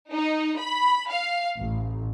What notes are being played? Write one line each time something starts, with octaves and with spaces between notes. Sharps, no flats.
D#4
B5
F5
A1